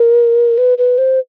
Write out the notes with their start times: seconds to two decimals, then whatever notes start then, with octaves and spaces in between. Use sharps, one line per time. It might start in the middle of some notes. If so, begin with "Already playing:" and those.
Already playing: A#4
0.58 B4
0.78 B4
0.98 C5